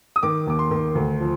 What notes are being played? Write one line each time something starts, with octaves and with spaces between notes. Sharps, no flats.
D#6
D#3 D6
D#2 D6
C6
D#3
D2
F3